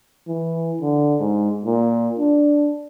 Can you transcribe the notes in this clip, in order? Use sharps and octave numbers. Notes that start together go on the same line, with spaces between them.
E3
D3
G#2
A#2
D4